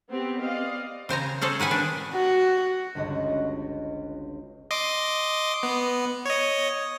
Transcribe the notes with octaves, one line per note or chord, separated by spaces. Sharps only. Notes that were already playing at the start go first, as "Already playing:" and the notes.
B3 C4 G4
D5 D#5 F5
C#3 C5 G#5 A#5
C#4 G#4 A4 C5
D#3 B4 F#5 G#5
D4
F#4
G1 C#2 F#4 D#5
D#5 C6 D6
B3
C#5 D#5